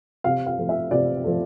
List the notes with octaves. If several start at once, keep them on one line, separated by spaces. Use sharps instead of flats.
C3 F5
F5
F3 A3
E5
C3 D5
F3 A3